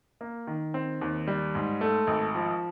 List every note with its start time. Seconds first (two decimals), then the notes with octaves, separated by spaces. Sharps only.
0.21 A#3
0.47 D#3
0.74 C4
1.01 D#2
1.27 G3
1.55 G#2
1.81 A3
2.07 G#1
2.35 F3